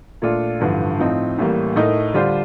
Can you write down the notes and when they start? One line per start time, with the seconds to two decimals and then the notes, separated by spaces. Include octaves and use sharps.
0.22 A#2 A3 D4 F4 A4
0.60 A1 G2 D3 F3
0.99 A2 F3 C4 D#4
1.38 A1 A2 G3 A#3
1.76 A2 A3 D#4 A#4
2.14 D3 G3 D4 F4 C5